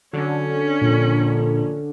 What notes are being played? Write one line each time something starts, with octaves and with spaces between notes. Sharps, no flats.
D3 F#3 C#4
A#1 A#2